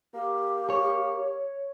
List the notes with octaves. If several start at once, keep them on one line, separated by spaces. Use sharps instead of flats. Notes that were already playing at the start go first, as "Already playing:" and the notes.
A#3 G4
C#5